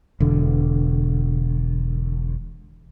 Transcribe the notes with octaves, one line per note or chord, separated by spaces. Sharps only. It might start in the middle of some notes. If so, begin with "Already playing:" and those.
E1 D3